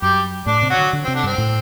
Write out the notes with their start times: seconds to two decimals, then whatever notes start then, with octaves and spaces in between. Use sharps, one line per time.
0.01 F#2 G3 G4
0.46 A2 D4 D5
0.62 C3
0.70 F#3 F#4
0.77 D3
0.93 D3
1.04 C3 C4
1.15 D3 D4
1.23 G2 C4
1.38 A2